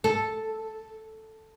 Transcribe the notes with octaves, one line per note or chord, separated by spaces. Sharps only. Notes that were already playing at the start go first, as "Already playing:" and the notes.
A4